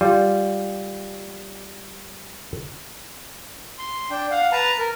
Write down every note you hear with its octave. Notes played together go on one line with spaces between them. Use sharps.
G3 F4
C6
D4 G5
F5 F#5
B4 A5 A#5
A#4